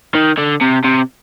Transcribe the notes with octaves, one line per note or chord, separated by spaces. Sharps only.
D#3
D3
C3
C3